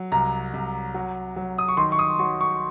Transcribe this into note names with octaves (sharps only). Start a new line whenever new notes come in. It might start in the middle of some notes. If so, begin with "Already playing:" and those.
Already playing: F#3
C2 A#5
C2
F#3
F#3
D#6
C#6
D#3 C6
C#6
D#6
F#3 C#6
C#6